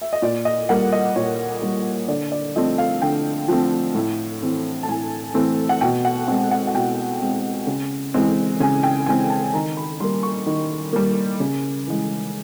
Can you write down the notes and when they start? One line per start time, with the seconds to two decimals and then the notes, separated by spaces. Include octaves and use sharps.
0.01 E5
0.13 D#5
0.22 A#2 D5
0.45 D#5
0.69 G3 A#3 F#5
0.92 D#5
1.16 A#2 C#5
1.62 G3 A#3
2.08 D3 D5
2.32 D5
2.56 F3 A3 C4 D#5
2.78 F5
3.02 D3 G5
3.48 F3 A3 C4
3.95 A2
4.42 E3 A3 C4
4.83 A5
4.88 A2 G#5
5.34 E3 A3 C4
5.69 F#5
5.81 B2 G5
6.05 F#5
6.28 G#3 C4 F#5
6.51 F#5
6.67 F#5
6.74 B2 G5
7.21 G#3 C4
7.67 C#3
8.14 E3 G#3 C4
8.60 C#3 G#5
8.83 G5
9.06 E3 G#3 C4 G#5
9.30 A5
9.53 D#3 A#5
9.77 B5
10.00 G3 C6
10.04 A#3
10.23 C#6
10.46 D#3
10.93 G3 A#3
11.40 C#3
11.87 E3 G#3